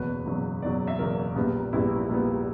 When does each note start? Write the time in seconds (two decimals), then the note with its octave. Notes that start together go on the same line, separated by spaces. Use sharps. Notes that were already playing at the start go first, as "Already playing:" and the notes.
Already playing: F#1 E2 B2 F#3 B4
0.25 F#1 E2 B2 F#3
0.62 F#1 E2 B2 F#3 D5
0.87 E5
0.99 F#1 E2 B2 F#3 A#4
1.35 A#1 A#2 G3 B3
1.73 A#1 A#2 G3 B3 E4
2.09 A#1 A#2 G3 B3